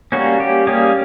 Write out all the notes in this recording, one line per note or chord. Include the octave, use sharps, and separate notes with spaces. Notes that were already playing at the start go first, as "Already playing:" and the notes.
G3 A#3 C#4 F#4
G4
G3 A#3 C#4 G#4